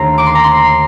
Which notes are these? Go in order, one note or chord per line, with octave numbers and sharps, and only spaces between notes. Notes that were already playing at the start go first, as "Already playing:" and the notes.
Already playing: D#2 D3 A3 D4 A#5 C6
D6
C6
A#5
C6